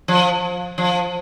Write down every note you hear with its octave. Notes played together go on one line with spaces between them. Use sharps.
F3
F3